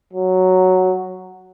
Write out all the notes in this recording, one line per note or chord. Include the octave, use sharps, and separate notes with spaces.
F#3